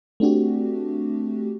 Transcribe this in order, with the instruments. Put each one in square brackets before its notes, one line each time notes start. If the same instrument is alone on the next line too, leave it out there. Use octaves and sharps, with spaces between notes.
[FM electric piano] A3 C4 D4 F#4 G4